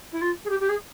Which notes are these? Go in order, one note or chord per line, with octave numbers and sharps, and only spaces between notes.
E4
F4
G#4
G4
G4
G#4